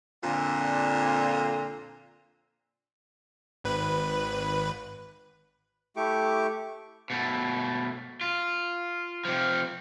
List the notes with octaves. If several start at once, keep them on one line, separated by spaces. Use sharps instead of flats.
F2 A#2 D3
G#1 B4
A3 E4 G4 C#6 D6
B2 A3
F4
C3 F3